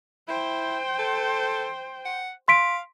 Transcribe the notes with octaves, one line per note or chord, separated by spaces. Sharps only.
E4 C5 G5
A4
F#5
F5 C6 B6 D7